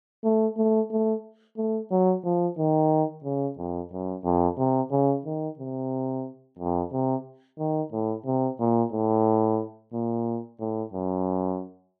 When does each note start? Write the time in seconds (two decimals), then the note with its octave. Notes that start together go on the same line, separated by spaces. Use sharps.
0.24 A3
0.57 A3
0.91 A3
1.57 A3
1.91 F#3
2.24 F3
2.58 D#3
3.24 C#3
3.58 F2
3.92 F#2
4.25 F2
4.58 C3
4.91 C#3
5.25 D#3
5.59 C3
6.59 F2
6.92 C3
7.59 D#3
7.92 A2
8.26 C3
8.60 A#2
8.93 A2
9.93 A#2
10.60 A2
10.93 F#2